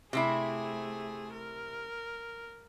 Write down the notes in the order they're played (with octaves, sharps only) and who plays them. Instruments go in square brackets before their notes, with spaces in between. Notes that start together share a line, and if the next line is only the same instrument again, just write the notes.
[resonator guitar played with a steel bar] C3 C4 E4 [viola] A3 G#4
[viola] A#4